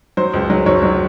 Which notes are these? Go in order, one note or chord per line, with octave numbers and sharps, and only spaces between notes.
F#3 C5
C#2
F#3
F#3 C#5
F#3